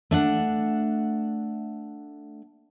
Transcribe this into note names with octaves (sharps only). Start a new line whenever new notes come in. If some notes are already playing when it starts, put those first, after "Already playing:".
A3 D4 F#5